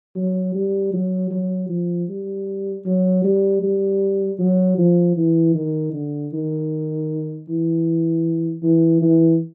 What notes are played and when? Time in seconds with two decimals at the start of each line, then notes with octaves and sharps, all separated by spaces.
0.16 F#3
0.55 G3
0.93 F#3
1.31 F#3
1.69 F3
2.09 G3
2.86 F#3
3.24 G3
3.63 G3
4.39 F#3
4.78 F3
5.17 E3
5.55 D#3
5.93 D3
6.33 D#3
7.49 E3
8.63 E3
9.02 E3